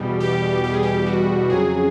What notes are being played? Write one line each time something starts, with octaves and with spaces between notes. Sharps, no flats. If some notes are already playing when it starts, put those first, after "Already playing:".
Already playing: E2 B2 G3
G4
G4
G#4
G4
F#4
F2 C#3 F#3 G#4